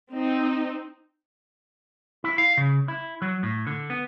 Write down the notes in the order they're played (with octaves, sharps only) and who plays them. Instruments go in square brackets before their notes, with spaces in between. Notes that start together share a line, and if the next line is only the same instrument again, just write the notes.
[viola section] C4 D#4
[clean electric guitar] E4
F5
C#3
E4
F#3
A2
D3
B3